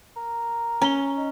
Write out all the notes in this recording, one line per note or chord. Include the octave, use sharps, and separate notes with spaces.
A#4
C#4 A#5 G7
D#4